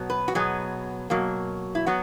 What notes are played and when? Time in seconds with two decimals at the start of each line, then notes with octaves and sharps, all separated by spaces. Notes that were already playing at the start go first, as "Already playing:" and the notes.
Already playing: B2 F#3 B3
0.10 B4
0.28 F#4
0.35 B2 F#3 B3 G#4
1.10 B2 F#3 A#3
1.75 E4
1.86 F#3 B3 F#4